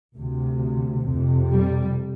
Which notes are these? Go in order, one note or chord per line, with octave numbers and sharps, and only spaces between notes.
D2 C3
F2 C3
G3